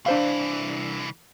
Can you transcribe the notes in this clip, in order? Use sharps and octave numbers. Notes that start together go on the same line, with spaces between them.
C2 E3 D4 C5 F5